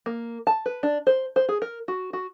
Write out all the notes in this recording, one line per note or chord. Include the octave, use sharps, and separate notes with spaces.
A#3
A5
B4
D4
C5
C5
G#4
A#4
F#4
F#4